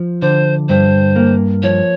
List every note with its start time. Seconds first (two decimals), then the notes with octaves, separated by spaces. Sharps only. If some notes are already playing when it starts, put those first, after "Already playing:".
Already playing: F3
0.22 D3 C5
0.69 G2 C5
1.16 A#3
1.63 F3 C#5